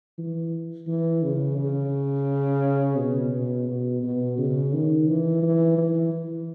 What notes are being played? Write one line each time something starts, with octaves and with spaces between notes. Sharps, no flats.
E3
E3
C#3
C#3
B2
B2
B2
B2
C#3
D#3
E3
E3
E3
E3